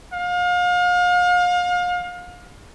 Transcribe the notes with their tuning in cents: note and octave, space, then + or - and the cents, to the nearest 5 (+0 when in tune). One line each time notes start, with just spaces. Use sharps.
F5 +35